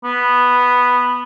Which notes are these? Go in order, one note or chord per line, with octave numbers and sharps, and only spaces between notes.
B3